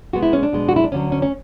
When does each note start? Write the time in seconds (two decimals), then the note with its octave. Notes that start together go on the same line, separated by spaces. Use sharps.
0.13 B2 G#3 B3 F#4
0.23 E4
0.33 C#4
0.43 D4
0.53 B2 G#3 B3
0.69 F#4
0.76 E4
0.84 D4
0.92 D2 D3 F#3 C#4
1.12 C#4
1.22 C#4